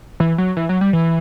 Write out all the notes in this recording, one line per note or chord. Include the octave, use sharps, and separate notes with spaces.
E3
F#3
E3
F#3
G3
E3